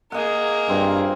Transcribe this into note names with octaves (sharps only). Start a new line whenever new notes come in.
A#3 G#4 D#5 F#5
G2 C4 F4 A#5